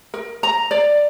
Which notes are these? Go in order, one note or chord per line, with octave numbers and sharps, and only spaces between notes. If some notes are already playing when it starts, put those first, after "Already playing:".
A#4
A#5
D5